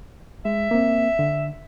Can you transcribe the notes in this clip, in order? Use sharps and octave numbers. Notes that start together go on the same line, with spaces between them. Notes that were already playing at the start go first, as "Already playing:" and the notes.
G#3 E5
A#3 C4
D3